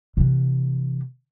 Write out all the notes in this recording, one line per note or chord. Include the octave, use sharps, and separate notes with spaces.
C3 E3